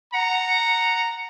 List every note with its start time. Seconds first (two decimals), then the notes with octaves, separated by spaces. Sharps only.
0.14 F#5 A#5